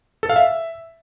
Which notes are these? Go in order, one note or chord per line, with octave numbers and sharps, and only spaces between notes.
A4
F5
E5